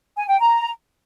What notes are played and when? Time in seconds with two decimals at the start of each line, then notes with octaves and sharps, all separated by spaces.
0.17 G#5
0.28 G5
0.40 A#5